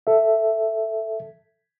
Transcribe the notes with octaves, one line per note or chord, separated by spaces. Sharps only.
A4 E5